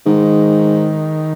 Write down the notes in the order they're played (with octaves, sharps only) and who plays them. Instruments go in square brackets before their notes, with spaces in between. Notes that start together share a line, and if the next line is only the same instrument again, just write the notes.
[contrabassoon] G#2 [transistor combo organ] D#3